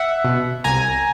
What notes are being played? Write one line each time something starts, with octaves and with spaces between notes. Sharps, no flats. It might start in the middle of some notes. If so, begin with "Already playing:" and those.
Already playing: E5 F#5
B2
C2 G#5 A#5